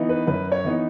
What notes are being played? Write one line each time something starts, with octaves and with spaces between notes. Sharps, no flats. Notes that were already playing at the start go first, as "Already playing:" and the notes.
Already playing: E3 B3 D#4
B4
F#2 B4
C#5
E3 B3 D#4